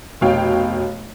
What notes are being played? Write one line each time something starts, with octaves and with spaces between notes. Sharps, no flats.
F1 B2 C#5 F5 G5